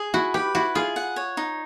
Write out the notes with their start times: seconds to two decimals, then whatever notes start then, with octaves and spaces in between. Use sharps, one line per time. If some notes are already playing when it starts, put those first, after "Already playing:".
Already playing: G#4
0.14 E4 F#4
0.34 G4 B4
0.55 E4 F#4
0.75 F4 G#4
0.96 F#5
1.16 C#5
1.37 D#4